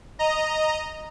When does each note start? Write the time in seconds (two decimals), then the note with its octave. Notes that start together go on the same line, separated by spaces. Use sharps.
0.19 D#5 A#5